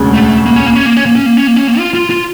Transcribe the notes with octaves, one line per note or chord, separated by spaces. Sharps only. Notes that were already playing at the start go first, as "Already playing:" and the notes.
Already playing: E1 D2 C#3
A3
A#3
C#4
A#3
C#4
A#3
C#4
A#3
C#4
A#3
C#4
A#3
C#4
A#3
F4
F4
F4